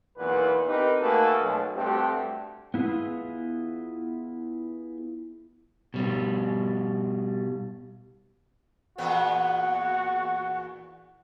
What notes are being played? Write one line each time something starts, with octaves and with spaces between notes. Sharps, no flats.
B1 E2 A#2 F#4 B4
C4 D#4 G4 A#4 B4
A3 A#3 F#4 G#4 A4 B4
B1
G2 A3 C4 F#4 G4
B3 E4 F4 G#4
B2 G3
E2 A#2 B3 F#4